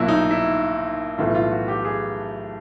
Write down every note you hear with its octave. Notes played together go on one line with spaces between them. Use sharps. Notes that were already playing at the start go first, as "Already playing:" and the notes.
Already playing: B1 A#2 F#3 E4
D#4
E4
B1 A2 E3 A3 F4
F4
F#4
G4
G#4